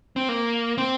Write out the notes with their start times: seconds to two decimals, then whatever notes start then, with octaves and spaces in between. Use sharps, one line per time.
0.16 C4
0.29 A#3
0.78 C4